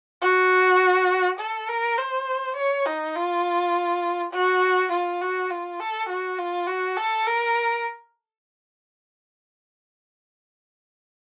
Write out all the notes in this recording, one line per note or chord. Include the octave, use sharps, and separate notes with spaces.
F#4
A4
A#4
C5
C#5
D#4
F4
F#4
F4
F#4
F4
A4
F#4
F4
F#4
A4
A#4